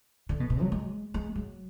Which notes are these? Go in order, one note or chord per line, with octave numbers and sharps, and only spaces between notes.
D3
B2
B2
F#3
G#3
G#3
F#3